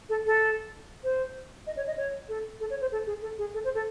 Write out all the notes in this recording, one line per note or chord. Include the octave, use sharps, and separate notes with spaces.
A4
A4
C5
D#5
C#5
D#5
C#5
A4
A4
C#5
C5
A4
G#4
A4
G#4
A4
C5
A4